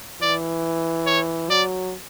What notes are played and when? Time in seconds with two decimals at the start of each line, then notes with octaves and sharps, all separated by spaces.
0.21 E3 D5
1.06 C#5
1.49 F#3 D5